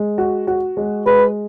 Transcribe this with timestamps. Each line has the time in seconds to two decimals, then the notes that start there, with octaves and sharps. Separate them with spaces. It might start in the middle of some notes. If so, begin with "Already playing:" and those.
Already playing: G#3
0.18 F#4
0.47 F#4
0.77 G#3
1.06 G#3 B4